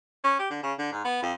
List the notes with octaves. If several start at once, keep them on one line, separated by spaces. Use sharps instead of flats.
C#4
G4
D3
C#3
D3
G#2
B3
F2